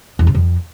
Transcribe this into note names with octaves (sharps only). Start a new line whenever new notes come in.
E2
C#3
F2